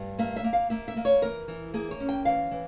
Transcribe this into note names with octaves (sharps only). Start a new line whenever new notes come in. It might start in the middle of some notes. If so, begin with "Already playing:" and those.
Already playing: G2
A#3 E5
E5
A#3
F5
A#3 E5
E5
A#3
C#5
E3 A#4
E3
A#3 G#4
C#5
C#4
G5
E3 F5
E3